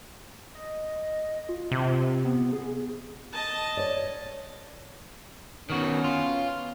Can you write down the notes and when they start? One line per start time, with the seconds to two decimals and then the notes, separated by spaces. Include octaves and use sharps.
0.55 D#5
1.49 F4
1.72 C3
2.25 B3
2.53 G#4
3.32 D#5 A5
3.77 C#5 D5
5.70 D#3 B3 C#4 F#4
6.04 F4